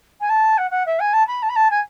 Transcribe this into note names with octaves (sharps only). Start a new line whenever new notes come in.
G#5
A5
F#5
F#5
E5
G#5
A5
B5
A5
B5
A5
G#5